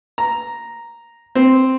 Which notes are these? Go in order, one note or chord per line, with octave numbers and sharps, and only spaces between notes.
A#5
C4